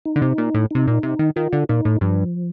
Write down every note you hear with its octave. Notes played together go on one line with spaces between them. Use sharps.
D#4
D3
C3
A#2
A2
C3 D#4
A#2
C3
D#3
D#3 F4
D3
A#2 D#4
A2
G2 F3